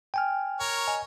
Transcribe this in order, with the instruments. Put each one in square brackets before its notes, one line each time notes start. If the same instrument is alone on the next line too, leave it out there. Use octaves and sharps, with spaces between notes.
[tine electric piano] G5 G#5 F6
[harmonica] A#4 C#5
[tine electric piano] D#5 G#5